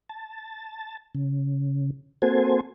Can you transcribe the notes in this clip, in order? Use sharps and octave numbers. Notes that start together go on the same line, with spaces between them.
A5
C#3
A#3 C4 F#4 A4 C5 G#5